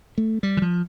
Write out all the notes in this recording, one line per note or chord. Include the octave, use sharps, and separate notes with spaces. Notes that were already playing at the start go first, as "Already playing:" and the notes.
A3
G3
E3
F3